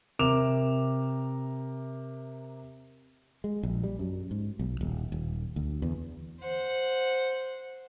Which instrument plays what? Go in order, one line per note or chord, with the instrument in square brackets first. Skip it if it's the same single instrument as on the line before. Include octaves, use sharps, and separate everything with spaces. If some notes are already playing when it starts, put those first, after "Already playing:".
[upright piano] C3 A#4 D6 E7 F7
[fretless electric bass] G#3
A#1
G3
F#2
G#2
B1
D#1
D#1
D2
E2
[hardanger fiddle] C5 F#5